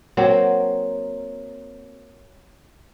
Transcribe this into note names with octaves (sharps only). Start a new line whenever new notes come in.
F#3 A#3 C4 G5